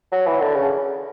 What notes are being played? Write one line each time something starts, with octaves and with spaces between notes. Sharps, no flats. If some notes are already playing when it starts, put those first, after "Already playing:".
F#3
E3
D3
C#3